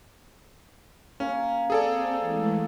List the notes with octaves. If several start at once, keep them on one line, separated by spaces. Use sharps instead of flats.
A#3 C#4
C4 G#4 A4 D5
E3 G#3 A3